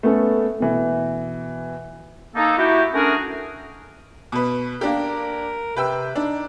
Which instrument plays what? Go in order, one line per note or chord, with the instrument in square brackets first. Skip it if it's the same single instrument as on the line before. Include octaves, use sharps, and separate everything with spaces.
[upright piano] A3 B3 C#4 A4
B2 E3
[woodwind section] A#3 D#4 A4
E4 F#4 G4
A3 C#4 D4 F#4 G#4 A#4
[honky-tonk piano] B2 B4
[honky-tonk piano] A#3 D4 G4 [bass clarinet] A#4
[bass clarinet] C3 [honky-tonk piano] B4 G5 E6
[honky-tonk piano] D4 [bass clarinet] D#4